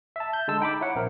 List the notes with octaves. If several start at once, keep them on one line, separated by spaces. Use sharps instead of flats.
E5 A5
G6
D3 G#3 A5 E6
D#4 G5 B5 D6
E4 C#5 F#5
A#1 C4 A#4